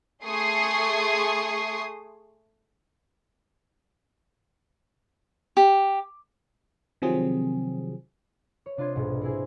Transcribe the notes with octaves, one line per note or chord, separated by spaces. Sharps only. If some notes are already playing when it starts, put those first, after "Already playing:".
A3 G#4 C6 C#6 D#6 C7
G4
C3 D#3 F3 F#3 C4 G#4
C#5
C3 D4 F4 D#5 C6 G#6
B1 G#2 B2
C4 E4 G#4